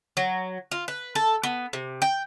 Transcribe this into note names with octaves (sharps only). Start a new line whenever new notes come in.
F#3
F4
B4
A4
B3
C3
G5